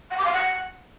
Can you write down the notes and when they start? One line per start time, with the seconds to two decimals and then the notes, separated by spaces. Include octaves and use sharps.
0.10 F#5
0.17 D6
0.25 F5
0.32 F#5